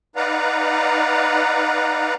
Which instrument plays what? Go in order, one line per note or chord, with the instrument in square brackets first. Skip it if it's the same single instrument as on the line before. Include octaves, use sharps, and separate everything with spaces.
[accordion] D#4 B4 D5 F5 F#5 A#5